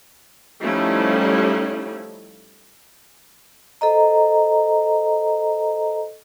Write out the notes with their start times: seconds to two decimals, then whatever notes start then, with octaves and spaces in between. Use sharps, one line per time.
0.63 F3 G3 A3 C#4 D#4 E4
3.81 A4 C5 D#5 A#5